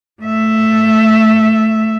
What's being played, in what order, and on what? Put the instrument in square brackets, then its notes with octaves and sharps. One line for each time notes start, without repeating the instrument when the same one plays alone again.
[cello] A3 E5